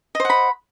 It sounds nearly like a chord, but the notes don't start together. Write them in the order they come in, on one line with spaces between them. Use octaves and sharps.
D#5 C5 F#5 B5